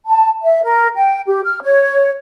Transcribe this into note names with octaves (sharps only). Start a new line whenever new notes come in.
A5
E5
A#4
G5
G4
F6
C#5